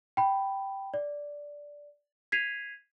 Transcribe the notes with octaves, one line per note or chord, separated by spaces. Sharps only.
G5 B5
D5
G#6 B6 C7 D#7 F7